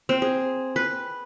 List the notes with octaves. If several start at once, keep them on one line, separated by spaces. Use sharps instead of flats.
C4
G#4
B4